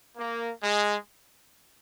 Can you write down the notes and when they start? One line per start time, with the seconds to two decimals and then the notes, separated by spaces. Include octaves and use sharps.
0.17 A#3
0.62 G#3